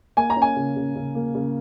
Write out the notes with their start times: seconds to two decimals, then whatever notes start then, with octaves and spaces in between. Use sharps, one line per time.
0.17 A#3 G#5
0.30 A#5
0.36 C#4
0.42 G#5
0.56 C#3
0.76 C#3
0.95 C#3
1.15 A#3
1.35 C#3